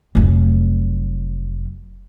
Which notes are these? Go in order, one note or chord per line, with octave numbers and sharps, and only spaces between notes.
F1 F#3